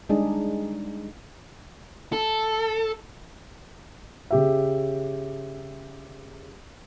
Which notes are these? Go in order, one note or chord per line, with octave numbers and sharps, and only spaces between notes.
G3 G#3 D4 D#4 G#4
A4
C#3 G4 E5